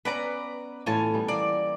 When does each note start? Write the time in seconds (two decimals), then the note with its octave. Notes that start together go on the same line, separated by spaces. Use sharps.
0.05 B3 C#4 B4 D5 A#5
0.86 A2 E3 F4 C#5 G#5 A5
1.14 G3 B3
1.28 E3 A#3 D5